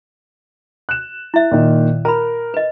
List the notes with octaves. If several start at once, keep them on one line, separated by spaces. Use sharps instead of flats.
F#6 E7
E4 E5
A#2 D#3
A#4 A#5 B5
B4 D#5